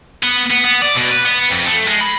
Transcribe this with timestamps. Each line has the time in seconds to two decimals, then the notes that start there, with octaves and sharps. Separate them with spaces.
0.23 B3
0.51 B3
0.65 B3
0.82 D5
0.95 B2
1.11 B4
1.25 B3
1.51 F2
1.66 A3
1.87 G#3
2.01 B5